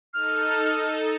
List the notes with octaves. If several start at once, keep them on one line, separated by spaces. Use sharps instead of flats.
D#4 A4 F6